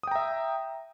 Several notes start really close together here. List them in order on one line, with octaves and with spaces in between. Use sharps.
D#6 G5 A#5 E5